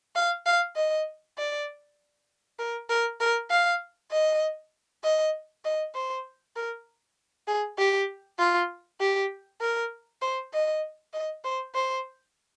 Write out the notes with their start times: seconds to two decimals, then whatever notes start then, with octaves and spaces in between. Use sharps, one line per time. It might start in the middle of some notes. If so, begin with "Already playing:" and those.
0.16 F5
0.46 F5
0.76 D#5
1.38 D5
2.59 A#4
2.89 A#4
3.20 A#4
3.51 F5
4.12 D#5
5.04 D#5
5.65 D#5
5.95 C5
6.56 A#4
7.48 G#4
7.78 G4
8.39 F4
9.01 G4
9.61 A#4
10.22 C5
10.53 D#5
11.13 D#5
11.45 C5
11.75 C5